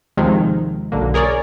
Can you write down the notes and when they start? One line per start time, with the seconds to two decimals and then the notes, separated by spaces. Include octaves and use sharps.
0.17 D#2 C3 D#3 F3 G#3
0.92 B1 D3 A#3
1.14 G#4 A#4 C#5 D5